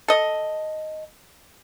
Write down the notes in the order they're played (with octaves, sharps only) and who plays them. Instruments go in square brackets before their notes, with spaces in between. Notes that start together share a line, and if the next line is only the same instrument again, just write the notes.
[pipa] A4 D#5